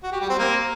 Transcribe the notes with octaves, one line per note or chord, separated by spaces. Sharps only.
F#4
G4
G3
C4
A#3